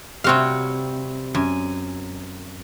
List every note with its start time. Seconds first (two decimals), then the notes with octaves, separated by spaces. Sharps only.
0.24 C3 G3 C4 F#4 C#5 F5
1.35 F#2 G#5